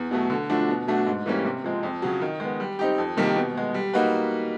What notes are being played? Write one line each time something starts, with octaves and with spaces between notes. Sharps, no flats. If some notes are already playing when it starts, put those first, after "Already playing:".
Already playing: E2
B2 F#3 A3
D3
F3 A3 D4 F#4
B2
F#3 A3 D4 F#4
G#2
E3 G3 A#3 C#4
C3
F3 G#3 C4
F2
C#3 F#3
D#3
G#3 B3
G3
C4 D#4 G4
F2
C3 D#3 G3 A#3
B2
G#3 B3
G3
A#3 D#4 F#4 B4